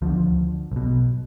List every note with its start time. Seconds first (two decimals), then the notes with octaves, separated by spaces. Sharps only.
0.02 D2 D3 F3
0.72 B1 B2